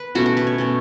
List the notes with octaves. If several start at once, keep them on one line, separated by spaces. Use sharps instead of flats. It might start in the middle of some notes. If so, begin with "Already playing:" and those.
Already playing: B4
B2 A3 C#4 F#4
F#4
B4
C#5
B2 A3 C#4